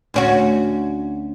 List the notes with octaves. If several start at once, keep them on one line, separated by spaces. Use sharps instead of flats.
D2 C#4 F#4